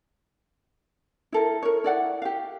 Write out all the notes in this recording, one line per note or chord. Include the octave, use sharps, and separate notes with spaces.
E4 A4 A#4
A#4 C#5
E4 D5 F#5
G4 F5